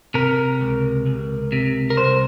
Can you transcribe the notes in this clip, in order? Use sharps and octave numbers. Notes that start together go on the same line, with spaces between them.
C3 A#4
C#2
C#2
C3
A#4
C2 C5